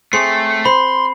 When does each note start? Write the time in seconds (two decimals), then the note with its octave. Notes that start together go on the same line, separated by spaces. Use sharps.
0.13 A3 C4 G#4 C#5 C7
0.66 C5 B5 C6